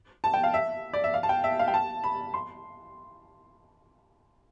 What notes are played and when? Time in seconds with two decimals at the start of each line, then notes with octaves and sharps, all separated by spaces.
0.24 A5
0.34 G5
0.44 F5
0.54 E5
0.93 D5
1.04 E5
1.14 F5
1.23 A5
1.29 G5
1.44 E5
1.59 F5
1.68 G5
1.74 A5
2.04 B5
2.34 C6